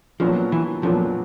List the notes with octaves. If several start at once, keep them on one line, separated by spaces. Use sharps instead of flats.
A#2 F3 F#3 B3 D4 F#4
E3
A#2 F3 F#3 B3 D4 F#4